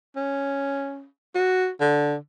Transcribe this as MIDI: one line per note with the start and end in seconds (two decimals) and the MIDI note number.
0.16 1.06 61
1.35 1.69 66
1.80 2.16 50